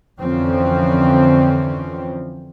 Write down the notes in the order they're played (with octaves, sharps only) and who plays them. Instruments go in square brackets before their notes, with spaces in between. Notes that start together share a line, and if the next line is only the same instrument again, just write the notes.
[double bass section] F2 D3 E3 F3 C4 C#4